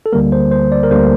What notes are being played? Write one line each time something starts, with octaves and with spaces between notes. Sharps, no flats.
A4
D2 D3 G3 A#3 A#4
C5
C5
D5
A#4
D2 D3 G3 A#3 C5